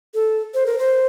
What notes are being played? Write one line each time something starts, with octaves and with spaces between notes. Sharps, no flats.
A4
C5
A#4
C5